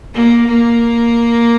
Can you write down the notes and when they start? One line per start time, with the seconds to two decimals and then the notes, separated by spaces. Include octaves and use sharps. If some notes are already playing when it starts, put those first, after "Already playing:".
0.14 A#3
0.47 A#3